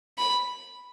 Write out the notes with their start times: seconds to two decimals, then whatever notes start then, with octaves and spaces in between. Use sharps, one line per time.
0.18 B5